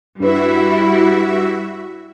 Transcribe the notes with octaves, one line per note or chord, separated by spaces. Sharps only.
G2 G3 E4 F#4 B4 E5